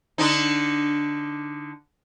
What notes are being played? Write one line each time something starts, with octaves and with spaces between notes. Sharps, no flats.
D3 D4 D#4